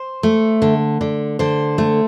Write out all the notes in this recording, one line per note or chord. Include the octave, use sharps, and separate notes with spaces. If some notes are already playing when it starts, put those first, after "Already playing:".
Already playing: C5
A3
D3
D3
D3 C5
A3